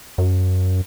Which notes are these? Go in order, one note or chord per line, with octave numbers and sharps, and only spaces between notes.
F#2